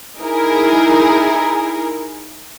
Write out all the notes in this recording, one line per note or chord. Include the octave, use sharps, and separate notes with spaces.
D#4 E4 G#4 A#4